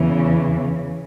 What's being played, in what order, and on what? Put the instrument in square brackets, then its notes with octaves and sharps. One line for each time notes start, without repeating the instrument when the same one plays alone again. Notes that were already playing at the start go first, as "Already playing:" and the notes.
Already playing: [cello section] E2 C#3 E3